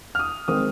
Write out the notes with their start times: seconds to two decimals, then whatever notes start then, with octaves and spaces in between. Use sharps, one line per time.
0.15 F6
0.19 D#6
0.48 D#3 G#3 C4 D#6